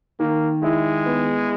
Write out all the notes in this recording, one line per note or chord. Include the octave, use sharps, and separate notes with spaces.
D#3 A#3
G#3 E4
B3